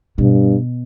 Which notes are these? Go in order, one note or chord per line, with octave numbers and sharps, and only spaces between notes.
G2 B2